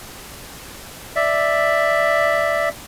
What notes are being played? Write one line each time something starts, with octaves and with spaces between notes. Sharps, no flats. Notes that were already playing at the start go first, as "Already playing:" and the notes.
D5 E5